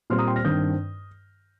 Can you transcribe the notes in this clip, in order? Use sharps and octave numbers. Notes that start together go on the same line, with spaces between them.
A#2 G3 C4 C6 F6
A#5 D#6
G5 C6
F6 A#6
G2 D#3 C4 D#6 G6